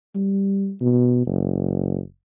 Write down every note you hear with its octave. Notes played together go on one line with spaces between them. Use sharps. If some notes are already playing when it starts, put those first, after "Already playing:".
G3
B2
F#1